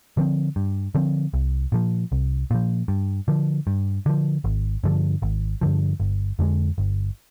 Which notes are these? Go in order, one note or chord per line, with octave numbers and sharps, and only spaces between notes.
D3 F3 C4
G2
D3 F3 C4
C2
A#2 F3
C2
A#2 F3
G2
D3 F3
G2
D3 F3
G#1
G2 D3 F3
G#1
G2 D3 F3
G1
F2 D3 G#3
G1